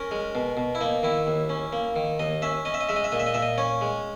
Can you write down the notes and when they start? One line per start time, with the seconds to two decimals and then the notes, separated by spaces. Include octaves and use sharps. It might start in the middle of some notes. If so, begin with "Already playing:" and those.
Already playing: C#4 A#4
0.11 G#3
0.35 B2
0.57 B2
0.75 E4
0.81 A#3 D#4
1.03 D#3 E4
1.27 D#2
1.49 C#4
1.73 A#3
1.96 D#3
2.19 D#2 D#5
2.42 C#4 E5
2.65 C#4 D#5
2.74 E5
2.81 D#5
2.89 G#3 E5
2.96 D#5
3.04 E5
3.12 A#2 D#5
3.20 E5
3.27 D#5
3.34 A#2 E5
3.42 D#5
3.58 C#4 C#5
3.81 G#3